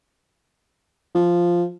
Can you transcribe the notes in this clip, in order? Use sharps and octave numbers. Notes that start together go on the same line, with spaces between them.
F3